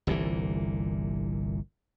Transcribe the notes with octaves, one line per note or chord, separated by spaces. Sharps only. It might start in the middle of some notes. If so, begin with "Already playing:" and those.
G1 C2 A#2 E3